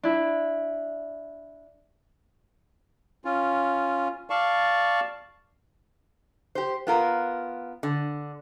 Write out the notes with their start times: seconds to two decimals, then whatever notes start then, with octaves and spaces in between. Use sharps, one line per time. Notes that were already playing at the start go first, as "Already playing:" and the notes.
0.03 D4 E4
3.25 C#4 F4
4.30 D5 F5 A5 C#6
6.55 G4 C5
6.87 B3 F4 A#4
7.83 D3